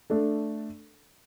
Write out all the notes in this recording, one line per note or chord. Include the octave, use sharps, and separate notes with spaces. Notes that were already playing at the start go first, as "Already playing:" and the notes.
A3 D4 A4